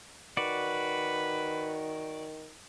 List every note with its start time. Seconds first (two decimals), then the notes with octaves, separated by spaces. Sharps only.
0.37 D#3 F#4 B4 D5